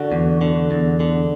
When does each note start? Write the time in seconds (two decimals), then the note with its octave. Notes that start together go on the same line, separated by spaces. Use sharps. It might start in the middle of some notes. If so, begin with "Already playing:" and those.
Already playing: D3 F#4
0.12 E2
0.41 D3
0.71 E2
1.00 D3